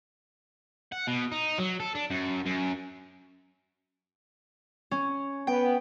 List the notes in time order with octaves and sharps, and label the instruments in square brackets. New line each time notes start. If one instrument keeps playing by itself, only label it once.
[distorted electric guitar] F#5
B2
D#4
F#3
A4
D4
F#2
F#2
[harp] C#4
[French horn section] B3 [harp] G5